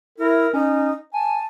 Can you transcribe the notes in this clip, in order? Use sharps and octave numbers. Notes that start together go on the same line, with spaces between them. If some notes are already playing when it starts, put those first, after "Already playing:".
E4 A#4
C#4 D#4
G#5 A5